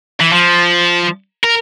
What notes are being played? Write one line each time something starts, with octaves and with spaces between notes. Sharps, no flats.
E3
F3
A#4